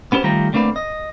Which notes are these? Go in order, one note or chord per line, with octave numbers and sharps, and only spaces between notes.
B3 C#4 G4 A4 C5
D#3 G3 A3 F4 G4 A#5
D3 A3 A#3 C4 B4 D5
D#5